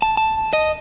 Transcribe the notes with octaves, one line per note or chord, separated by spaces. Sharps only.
A5
A5
D#5